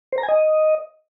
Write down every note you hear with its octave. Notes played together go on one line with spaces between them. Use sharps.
C5
A#5
G#5
D#5